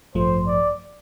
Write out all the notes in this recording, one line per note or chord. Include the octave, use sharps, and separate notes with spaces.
A1 G2 F3 A3 C5
D5